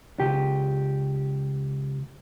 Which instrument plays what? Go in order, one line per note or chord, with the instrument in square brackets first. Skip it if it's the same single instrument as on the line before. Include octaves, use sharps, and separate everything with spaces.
[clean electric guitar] C#2 G4